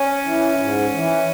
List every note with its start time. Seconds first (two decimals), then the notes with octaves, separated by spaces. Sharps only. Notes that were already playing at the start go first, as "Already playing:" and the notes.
Already playing: C#4
0.24 E3
0.58 G#2
0.93 E3